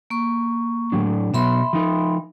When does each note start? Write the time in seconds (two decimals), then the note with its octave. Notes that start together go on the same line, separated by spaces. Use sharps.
0.10 A#3 C#6
0.92 A2 F#3 D4
1.34 B2 F#3 B3 E5 B5 C6
1.73 F3 D#4